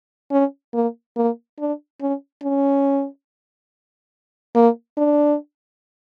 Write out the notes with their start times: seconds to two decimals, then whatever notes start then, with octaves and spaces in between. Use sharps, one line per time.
0.31 C#4
0.74 A#3
1.17 A#3
1.59 D4
2.01 C#4
2.43 C#4
4.56 A#3
4.98 D4